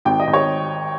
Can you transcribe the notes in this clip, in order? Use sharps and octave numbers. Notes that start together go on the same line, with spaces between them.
G#1 G5
D#5
G#1
C#5